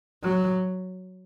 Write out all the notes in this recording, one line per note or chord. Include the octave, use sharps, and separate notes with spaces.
F#3